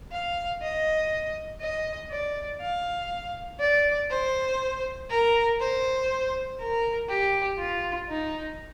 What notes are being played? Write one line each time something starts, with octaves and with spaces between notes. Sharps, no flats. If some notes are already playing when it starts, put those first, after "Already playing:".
F5
D#5
D#5
D5
F5
D5
C5
A#4
C5
A#4
G4
F4
D#4